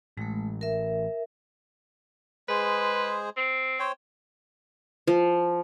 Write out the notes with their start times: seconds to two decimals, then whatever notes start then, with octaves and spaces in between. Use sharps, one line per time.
0.17 A1 G#3 A3
0.61 A#4 E5
2.49 G#3 G#4 B4 C5
3.37 C4
3.79 C5 C#5 G5
5.07 F3